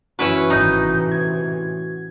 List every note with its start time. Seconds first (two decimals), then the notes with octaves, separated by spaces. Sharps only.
0.19 F#2 E3 C#4 E4 F#4 B4
0.50 G#1 A2 C3 E3 D#4 G6
1.12 G#6